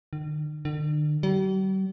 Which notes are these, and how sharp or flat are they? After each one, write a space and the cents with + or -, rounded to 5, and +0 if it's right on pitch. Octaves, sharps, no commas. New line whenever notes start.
D#3 -45
D3 +40
G3 -45